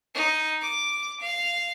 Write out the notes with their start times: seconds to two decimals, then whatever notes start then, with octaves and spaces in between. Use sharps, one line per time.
0.15 D#4
0.62 D6
1.20 F5